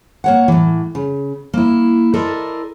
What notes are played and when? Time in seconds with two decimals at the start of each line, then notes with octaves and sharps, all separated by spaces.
0.24 A#3 C#5 F#5
0.48 A2 E3
0.95 C#3
1.54 A#3 E4
2.14 E4 A4 A#4 C5 D5 D#5